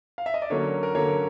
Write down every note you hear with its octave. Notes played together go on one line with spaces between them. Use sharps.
F5
E5
D#5
D5
D3 F#3 A#3 C#4 C#5
A#4
D3 F#3 A#3 C#4 C#5